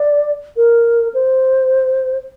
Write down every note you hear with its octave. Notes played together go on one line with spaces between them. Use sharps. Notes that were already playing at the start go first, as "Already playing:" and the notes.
Already playing: D5
A#4
C5